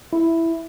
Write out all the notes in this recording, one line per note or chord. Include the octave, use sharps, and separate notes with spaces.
E4